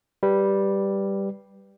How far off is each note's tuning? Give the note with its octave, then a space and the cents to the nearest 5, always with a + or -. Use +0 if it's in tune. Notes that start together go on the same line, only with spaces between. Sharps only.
G3 +0 B4 +0